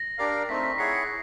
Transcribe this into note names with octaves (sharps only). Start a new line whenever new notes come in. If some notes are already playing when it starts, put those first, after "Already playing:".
Already playing: A#6
D4 G4 A#4 D5 F5
A3 C4 D#4 B6
B6
E4 G#4 C#5 F#5 C7